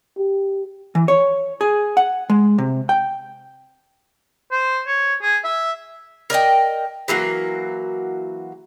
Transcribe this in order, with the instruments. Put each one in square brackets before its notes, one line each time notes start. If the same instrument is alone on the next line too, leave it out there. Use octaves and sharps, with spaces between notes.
[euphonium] G4
[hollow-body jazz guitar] E3
C#5
G#4
F#5
G#3
C3
G5
[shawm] C5
C#5
G#4
E5
[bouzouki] A#4 D5 D#5 G5
E3 F#3 A#3 F#4